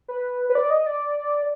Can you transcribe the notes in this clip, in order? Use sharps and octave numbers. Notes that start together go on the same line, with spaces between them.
B4
B4
D5
D#5
D5